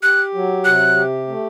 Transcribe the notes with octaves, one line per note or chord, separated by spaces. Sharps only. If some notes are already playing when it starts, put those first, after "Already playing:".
G4 F#6
F#3
C3 F#6
G4
A3